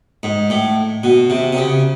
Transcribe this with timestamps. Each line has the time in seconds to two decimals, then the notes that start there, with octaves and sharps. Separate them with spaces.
0.23 G#2
0.50 A2
1.04 B2
1.30 C3
1.53 C3
1.57 C#3